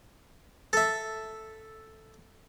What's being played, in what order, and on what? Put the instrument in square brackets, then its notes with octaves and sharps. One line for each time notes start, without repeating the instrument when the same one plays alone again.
[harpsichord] A4 E5